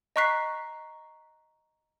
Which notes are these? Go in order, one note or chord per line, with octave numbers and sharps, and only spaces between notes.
D#5 A#5 C#6 F#6 B6 C7